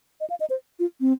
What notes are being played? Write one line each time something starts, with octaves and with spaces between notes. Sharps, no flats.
D#5
F5
D#5
C5
F4
C4